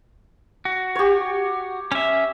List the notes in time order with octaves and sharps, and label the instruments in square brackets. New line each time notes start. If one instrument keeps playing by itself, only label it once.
[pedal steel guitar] F#4
[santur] G4 C#5
[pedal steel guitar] C#4 E5